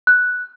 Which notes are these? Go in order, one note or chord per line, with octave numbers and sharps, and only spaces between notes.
F#6